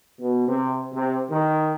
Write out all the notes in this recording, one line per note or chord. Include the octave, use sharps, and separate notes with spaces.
B2
C3
C3
D#3